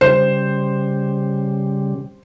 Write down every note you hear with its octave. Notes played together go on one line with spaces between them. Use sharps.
C#3 G3 C5